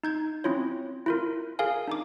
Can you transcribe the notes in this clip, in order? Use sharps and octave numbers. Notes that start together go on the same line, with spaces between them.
D#4 G6 G#6
C4 C#4 E4 F4 C#5
E4 F4 A#4
G#4 A#4 F5 G#5
D4 D#4 D6